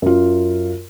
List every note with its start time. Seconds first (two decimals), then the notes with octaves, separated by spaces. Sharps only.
0.02 F#2 F4